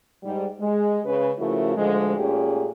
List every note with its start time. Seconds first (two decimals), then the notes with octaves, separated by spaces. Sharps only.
0.23 G#2 G3
0.60 G#3
1.04 C#3 C#4 B4
1.38 C#3 F3 A3 E4 F#4 A#4
1.76 D2 D3 F3 G#3
2.17 A#2 A3 C#4 G4 G#4